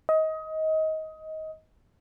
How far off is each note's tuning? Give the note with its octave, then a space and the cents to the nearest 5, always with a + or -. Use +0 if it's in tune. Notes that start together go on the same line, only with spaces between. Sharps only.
D#5 +20